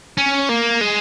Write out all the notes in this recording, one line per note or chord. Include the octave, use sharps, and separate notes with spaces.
C#4
A#3
G#3